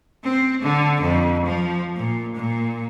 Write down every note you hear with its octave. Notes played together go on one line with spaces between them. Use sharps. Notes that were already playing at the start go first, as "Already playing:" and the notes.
C4
D3
F2
F3
A#2
A#2